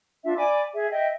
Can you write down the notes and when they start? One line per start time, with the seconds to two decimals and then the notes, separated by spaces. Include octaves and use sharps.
0.24 D4 F4 E5
0.36 D5 G#5 B5 D6
0.74 G#4 E5
0.90 D#5 E5 G5